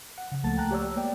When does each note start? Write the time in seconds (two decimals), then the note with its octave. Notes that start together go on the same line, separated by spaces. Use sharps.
0.18 F#5
0.32 C#3
0.43 C#2 F3 A3 A#3 A5 A6
0.57 G5 A#5 F#6
0.71 G4 C#5 D5 E6
0.95 G#3 A#3 B3 D5 G5